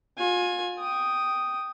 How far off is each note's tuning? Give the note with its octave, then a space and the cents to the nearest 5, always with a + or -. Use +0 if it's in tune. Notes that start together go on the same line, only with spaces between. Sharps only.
F4 +35 G#5 +0
G5 -5 D#6 +0